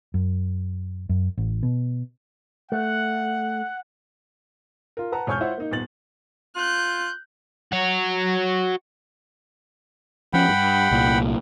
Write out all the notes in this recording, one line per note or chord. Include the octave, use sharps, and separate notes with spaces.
F#2
F#2
A1
B2
A3 F#5
F4 A#4
B4 F#5 A5 A#5
E1 C#5 G#5 C#6 F6 G6
E4 F4 C5 C#5 E5 F#5
A#3 D#4
D#1 B3 A6 F#7
F4 F#6 G6
F#4 C#5
F3 C#4 F#5 G5 B5
G2
C2 A#2